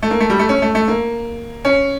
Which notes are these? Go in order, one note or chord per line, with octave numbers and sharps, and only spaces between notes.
A3
A#3
A3
G3
A3
C#4
A3
A3
A#3
C#4